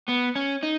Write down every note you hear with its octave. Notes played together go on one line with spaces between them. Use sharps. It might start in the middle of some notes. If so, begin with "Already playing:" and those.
B3
C#4
D#4